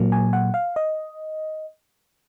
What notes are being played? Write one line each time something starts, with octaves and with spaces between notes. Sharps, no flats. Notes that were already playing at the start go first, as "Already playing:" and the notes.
Already playing: A#2 F#3 A#3
G#5
F#5
F5
D#5